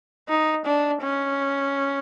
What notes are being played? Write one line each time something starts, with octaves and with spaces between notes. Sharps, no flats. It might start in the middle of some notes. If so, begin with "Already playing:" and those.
D#4
D4
C#4